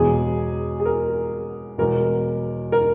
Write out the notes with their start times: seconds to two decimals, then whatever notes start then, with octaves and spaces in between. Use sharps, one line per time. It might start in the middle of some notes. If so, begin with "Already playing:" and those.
Already playing: E1 E2 B2 G#4
0.80 G#4
0.85 A#4
1.78 E1 E2 B2 A#4
2.72 A#4